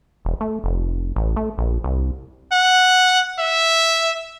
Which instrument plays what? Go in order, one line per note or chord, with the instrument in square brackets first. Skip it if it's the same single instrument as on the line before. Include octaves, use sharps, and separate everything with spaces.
[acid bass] E1
A3
F1
A1
A3
A#1
C2
[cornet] F#5
E5